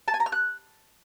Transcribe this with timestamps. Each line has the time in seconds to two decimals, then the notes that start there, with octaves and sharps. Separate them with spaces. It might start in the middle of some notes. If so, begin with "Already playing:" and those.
0.08 A5
0.14 G#5
0.20 A#5
0.26 F6
0.32 F#6